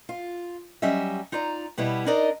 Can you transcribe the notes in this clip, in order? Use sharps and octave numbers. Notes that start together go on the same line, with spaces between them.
F4
F#3 G3 C#4 D#5 E5
D#4 F4 D5 A#5
B2 G3 B3 E4
D4 D#4 A#4 D5 D#5